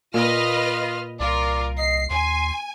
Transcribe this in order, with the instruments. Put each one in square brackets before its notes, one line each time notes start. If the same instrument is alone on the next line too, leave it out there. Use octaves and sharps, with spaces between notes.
[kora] A#2 [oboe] F4 [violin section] B4 D#5 F6
[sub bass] C2 [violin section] F4 A#4 [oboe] D5
[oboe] D#5 [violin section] C7
[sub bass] D#2 [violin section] G#5 [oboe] C6